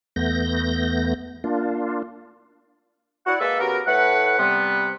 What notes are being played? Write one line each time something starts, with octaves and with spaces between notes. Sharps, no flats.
E2 A3 B3 G6 A#6
A#3 D4 F4
E4 F#4 D5 F#5
G#3 A#3 A4 B4 E5
C#3 B3 F#4 G4 A#4
A2 A3 B4 F#5
C3 G3 B3